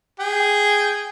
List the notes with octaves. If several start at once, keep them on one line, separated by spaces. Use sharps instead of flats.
G#4 G5